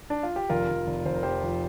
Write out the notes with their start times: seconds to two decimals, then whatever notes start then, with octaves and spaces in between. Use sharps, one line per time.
0.10 D4
0.23 F4
0.36 G4
0.49 F1 F4 A#4
0.68 F1
0.87 F1
1.05 F1 C5
1.15 A#4
1.23 F2 G4 C5
1.43 F2